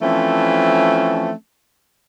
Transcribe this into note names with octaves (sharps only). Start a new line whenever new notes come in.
E3 F3 A3 C4 C#4